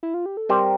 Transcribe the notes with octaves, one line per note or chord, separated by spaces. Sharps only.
E4
F4
G4
A4
G3 C4 G4 A#4 C5